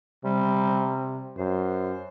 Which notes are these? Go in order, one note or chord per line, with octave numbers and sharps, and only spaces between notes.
C3 G3
F#2 C5